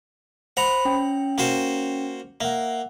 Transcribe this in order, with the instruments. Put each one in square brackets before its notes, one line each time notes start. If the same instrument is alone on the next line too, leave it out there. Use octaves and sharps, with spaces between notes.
[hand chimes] C5 B5 [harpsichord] F#5 A#5
[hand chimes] C#4 G5
[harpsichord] A#3 F#4 C5
[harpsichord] A#3 [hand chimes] E5 F#5